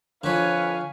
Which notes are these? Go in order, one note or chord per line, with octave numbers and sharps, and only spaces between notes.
F2 D3 F3 B4 C#5 F5 G#5